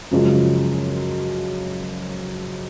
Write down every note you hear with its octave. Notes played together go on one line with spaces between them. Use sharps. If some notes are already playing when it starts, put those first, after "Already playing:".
F#2 C#3 F3 G#3